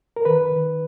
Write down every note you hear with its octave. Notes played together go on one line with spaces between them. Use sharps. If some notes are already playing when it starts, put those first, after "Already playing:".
A#4
D#3 B4
D#3